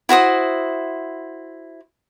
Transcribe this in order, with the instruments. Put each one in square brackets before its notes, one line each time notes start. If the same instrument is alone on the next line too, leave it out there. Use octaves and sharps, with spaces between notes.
[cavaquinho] E4 F#4 C5 D#6